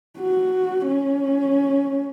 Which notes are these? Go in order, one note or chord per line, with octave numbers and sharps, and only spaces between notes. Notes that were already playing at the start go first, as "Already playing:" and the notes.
F#4
C#4